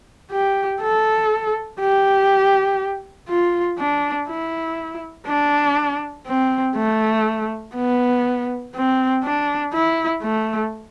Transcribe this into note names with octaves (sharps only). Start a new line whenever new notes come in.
G4
A4
G4
F4
D4
E4
D4
C4
A3
B3
C4
D4
E4
A3